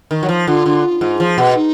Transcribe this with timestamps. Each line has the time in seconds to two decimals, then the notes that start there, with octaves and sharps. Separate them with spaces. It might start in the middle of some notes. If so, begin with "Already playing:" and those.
0.11 D#3
0.23 F#3
0.29 F3
0.47 D3 F4
0.66 D3
1.01 G#2
1.20 F3
1.38 B2
1.55 D#4